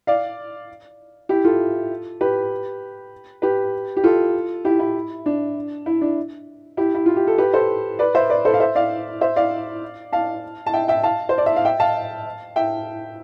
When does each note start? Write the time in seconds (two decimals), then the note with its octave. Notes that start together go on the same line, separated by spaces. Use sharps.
0.07 D5 F5
1.29 E4 G4
1.45 F4 A4
2.21 G4 B4
3.42 G4 B4
3.97 G4
4.04 F4 A4
4.65 E4 G4
4.80 E4
5.26 D4
5.86 E4
6.01 D4
6.77 E4 G4
6.95 E4
7.06 F4
7.16 G4
7.27 A4
7.38 G4 B4
7.54 A4 C5
7.99 B4 D5
8.15 C5 E5
8.30 B4 D5
8.45 A4 C5
8.54 F5
8.60 C5 E5
8.75 D5 F5
9.21 C5 E5
9.36 D5 F5
10.13 F5 A5
10.67 A5
10.73 E5 G5
10.88 E5 G5
11.03 F5 A5
11.29 C5
11.38 D5
11.46 E5
11.56 F5
11.65 E5 G5
11.80 F5 A5
12.56 E5 G5